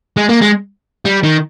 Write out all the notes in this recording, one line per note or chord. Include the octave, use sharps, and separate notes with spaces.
G#3
A#3
G#3
G3
D#3